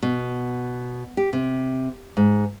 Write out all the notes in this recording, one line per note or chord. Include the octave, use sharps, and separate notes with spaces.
B2
G4
C3
G#2